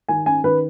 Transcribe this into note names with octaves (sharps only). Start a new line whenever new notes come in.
D#3 G#5
C#4 G#5
D#3 B4